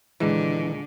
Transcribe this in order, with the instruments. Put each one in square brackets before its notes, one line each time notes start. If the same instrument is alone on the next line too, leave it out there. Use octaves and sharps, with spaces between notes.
[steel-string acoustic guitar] D#2 A#2 G#3 [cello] D3 [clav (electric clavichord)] E3